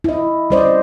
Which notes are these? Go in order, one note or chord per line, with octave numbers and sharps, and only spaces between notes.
E4 D#5
G3 C#4 C5 D5 D#5